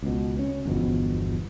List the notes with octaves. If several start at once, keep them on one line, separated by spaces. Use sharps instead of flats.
C#2 B2
C#4
G1 E2 B2 F3